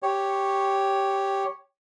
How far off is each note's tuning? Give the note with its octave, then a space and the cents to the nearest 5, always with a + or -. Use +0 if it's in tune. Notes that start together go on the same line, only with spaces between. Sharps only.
G4 +0 C#5 +0